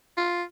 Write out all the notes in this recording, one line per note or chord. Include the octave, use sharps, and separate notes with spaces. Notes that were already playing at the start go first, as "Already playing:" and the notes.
F4